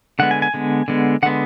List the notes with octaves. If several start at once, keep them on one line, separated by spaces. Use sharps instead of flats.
D3 G#3 B3 F#5
G#5
G#5
D3 G#3 B3
D3 G#3 B3
D3 G#3 B3 F#5